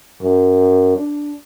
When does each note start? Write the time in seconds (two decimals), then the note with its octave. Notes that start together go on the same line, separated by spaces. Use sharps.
0.22 F#2
0.96 D4